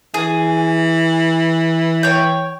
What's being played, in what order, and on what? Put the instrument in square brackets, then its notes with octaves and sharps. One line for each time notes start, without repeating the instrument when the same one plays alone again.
[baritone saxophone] E3 [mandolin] G#4
[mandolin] C#5 G5